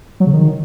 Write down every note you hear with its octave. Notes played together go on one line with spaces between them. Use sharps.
F#3
C#3
D#3